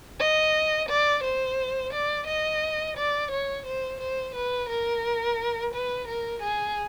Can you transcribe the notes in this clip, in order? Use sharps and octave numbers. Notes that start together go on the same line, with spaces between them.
D#5
D5
C5
D5
D#5
D5
C#5
C5
C5
B4
A#4
B4
A#4
G#4